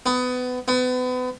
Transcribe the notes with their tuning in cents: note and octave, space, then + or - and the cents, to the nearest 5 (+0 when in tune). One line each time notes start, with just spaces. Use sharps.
B3 +25
B3 +35